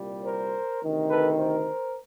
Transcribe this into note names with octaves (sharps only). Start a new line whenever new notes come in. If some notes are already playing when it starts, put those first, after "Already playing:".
Already playing: C2 A#2 G3
A#4 C5
D2 C3 D#3
A4 B4
A#4 C5